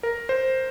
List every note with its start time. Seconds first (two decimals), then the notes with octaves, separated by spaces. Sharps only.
0.03 A#4
0.29 C5